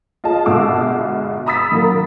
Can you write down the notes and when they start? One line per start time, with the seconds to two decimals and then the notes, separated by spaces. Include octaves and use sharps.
0.24 F4 G#4 D#5 A5
0.46 G1 B2 G#3 F5 D6 E6
1.46 A#5 B5 D#6 E6 A6 B6
1.72 D#3 F#3 A#3